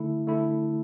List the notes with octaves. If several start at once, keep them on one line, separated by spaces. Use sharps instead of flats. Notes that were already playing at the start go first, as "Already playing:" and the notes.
Already playing: D3 A3 E4
D3 A3 E4